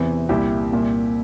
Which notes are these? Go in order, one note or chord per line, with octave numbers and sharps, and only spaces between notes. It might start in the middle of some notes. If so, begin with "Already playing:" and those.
Already playing: E2 C3 E3 C4
C2 A#2 E4 G4
C2 A#2